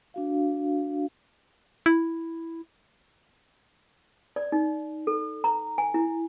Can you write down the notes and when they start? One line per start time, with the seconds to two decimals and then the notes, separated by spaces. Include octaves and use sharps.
0.14 D4 F#4 F5
1.86 E4
4.36 D5
4.52 D#4
5.07 A4
5.44 A#5
5.78 G#5
5.94 E4